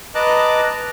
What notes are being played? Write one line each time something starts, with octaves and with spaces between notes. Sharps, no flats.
B4 D#5 A5 A#5 D6 F#6